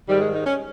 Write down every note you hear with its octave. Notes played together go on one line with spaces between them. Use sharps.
G#2 D#3 G3
G#3
D#4
C#4